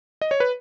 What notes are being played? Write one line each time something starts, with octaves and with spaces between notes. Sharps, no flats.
D#5
C#5
B4